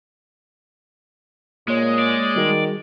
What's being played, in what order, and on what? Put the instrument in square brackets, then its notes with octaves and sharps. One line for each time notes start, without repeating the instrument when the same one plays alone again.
[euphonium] A#2 [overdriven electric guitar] G#3 [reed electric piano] A#3 C#5
[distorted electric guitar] D5
[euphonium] D#3 [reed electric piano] G3 F#4 G#4